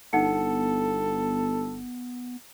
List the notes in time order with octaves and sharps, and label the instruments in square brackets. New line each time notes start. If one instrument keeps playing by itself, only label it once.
[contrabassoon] G1 [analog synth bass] B3 [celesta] D#4 F#5 C#7 [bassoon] A4